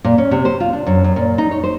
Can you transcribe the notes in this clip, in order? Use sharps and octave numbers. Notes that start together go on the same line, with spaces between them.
A#2
C#4
C3
C5
F4
D4
F#2
F#2
A#2
D#4
C#5
C5